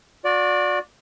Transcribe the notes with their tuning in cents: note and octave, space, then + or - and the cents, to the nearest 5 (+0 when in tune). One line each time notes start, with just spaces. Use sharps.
F#4 -35 D5 -5